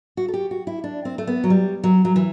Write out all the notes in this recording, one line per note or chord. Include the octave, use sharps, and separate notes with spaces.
F#4
A4
G4
F#4
E4
D4
C4
A3
B3
F#3
G3
F#3
F#3
E3